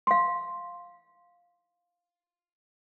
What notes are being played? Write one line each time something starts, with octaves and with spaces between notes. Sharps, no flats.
F5 C6